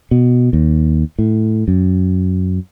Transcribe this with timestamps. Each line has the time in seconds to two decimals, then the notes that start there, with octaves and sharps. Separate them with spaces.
0.11 B2
0.53 D#2
1.19 A2
1.68 F#2